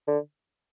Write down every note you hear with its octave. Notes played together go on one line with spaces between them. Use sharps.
D3